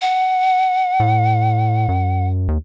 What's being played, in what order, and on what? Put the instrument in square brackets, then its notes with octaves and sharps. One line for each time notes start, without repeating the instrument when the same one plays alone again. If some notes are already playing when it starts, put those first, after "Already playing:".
[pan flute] F#5
[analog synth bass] A2
F#2
D#2